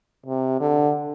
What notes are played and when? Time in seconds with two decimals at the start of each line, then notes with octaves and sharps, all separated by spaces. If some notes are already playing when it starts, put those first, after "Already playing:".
0.26 C3
0.61 D3